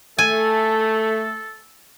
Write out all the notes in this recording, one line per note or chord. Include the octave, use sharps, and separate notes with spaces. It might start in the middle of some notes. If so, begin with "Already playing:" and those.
A3 A4 G#5